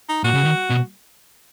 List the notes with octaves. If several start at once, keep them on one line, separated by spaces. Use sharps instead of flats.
D#4
A#2 F#4
C#3
D#3
B2